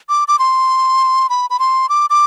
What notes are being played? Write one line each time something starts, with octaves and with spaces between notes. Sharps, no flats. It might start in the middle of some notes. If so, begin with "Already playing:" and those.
D6
D6
C6
B5
B5
C6
D6
D6